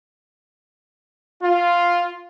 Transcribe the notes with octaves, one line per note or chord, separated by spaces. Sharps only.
F4